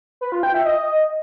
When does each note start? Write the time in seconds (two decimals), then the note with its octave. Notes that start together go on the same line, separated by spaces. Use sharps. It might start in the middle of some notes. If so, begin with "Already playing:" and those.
0.21 B4
0.32 F4
0.43 G5
0.54 E5
0.65 D#5